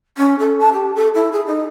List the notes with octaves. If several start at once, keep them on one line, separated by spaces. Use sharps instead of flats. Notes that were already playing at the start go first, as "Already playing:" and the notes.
C#4
A4
A5
G4
A4
E4
G#4
D#4